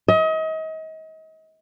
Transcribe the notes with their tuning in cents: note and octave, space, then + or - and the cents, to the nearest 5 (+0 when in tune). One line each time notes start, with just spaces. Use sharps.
D#5 +35